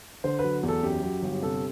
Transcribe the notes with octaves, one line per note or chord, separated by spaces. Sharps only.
D3 C5
B4
F#3
E2
A4
F#2 G4
F#3
G1
C3 A4